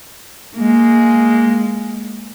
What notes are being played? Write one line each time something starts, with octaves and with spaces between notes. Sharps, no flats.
G#3 A#3